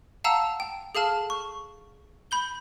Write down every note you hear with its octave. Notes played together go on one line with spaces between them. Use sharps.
F5 F#5 A5 A#5 E6
G5
G#4 A4 F5 A5 F6
C#6
B5 G6 G7